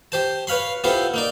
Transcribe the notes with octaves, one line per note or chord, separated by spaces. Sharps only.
G4 C5 A5
B4 C#5 F5 B5 C6
B3 E4 F4 G4 A4 C5
A#3 D#4 D5